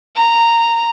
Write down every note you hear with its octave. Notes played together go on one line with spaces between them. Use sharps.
A#5